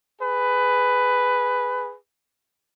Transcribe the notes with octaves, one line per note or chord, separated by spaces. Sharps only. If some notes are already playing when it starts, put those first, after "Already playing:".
G#4 B4